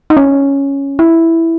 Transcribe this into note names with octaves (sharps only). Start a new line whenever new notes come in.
D#4
C#4
E4